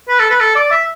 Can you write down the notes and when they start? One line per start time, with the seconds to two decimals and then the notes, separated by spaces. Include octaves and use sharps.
0.09 B4
0.19 A4
0.30 B4
0.40 A4
0.56 D5
0.71 E5